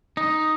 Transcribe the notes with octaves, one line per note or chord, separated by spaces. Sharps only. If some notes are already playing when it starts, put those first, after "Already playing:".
D#4